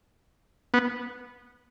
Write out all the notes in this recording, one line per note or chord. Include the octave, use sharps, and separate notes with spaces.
B3